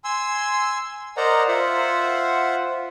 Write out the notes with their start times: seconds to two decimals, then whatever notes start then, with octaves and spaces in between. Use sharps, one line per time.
0.04 G#5 C6 E6
1.17 A#4 C5 D5 D#5 F#5 A#5
1.48 F4 C5 E5 F#5